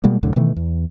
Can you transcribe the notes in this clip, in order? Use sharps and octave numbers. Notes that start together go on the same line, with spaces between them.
B2 G3 G#3 A#3
C2 F#2 A2 D3
B2 D#3 E3 A3
E2